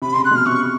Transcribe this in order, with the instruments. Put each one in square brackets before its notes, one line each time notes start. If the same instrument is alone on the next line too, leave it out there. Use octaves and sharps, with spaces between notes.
[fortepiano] C3 [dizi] B5
[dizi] C6
[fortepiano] C#3
[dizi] F#6
[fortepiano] B2 [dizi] F6
[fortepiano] C3 [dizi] C#6